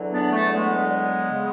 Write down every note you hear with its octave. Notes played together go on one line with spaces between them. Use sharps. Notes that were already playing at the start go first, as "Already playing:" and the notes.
Already playing: E2 D3 F#3
B3 D4
A3
G#3 B3
C#3 G#3